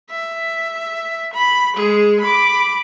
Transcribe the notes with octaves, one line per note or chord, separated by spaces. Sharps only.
E5
B5
G#3 G#4
B5 D6